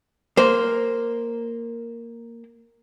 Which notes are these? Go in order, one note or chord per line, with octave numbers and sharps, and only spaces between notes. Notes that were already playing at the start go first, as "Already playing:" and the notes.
A#3 C5